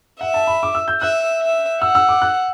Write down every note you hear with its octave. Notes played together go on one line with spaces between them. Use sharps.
E5 F#5
A5
B5
D6
E6
G6
E5 F#6
E5
F#5 E6
E6
D6
F#6